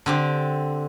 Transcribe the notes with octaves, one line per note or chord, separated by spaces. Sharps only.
D3 C4 G4